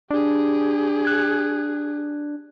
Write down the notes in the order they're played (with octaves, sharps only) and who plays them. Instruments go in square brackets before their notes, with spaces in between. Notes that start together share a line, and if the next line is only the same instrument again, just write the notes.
[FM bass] D4 [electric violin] G4 G#4
[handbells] F#6 G#6